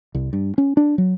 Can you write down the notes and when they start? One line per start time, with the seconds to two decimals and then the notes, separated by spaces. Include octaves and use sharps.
0.15 C2
0.33 G2
0.58 C#4
0.77 D4
0.98 F#3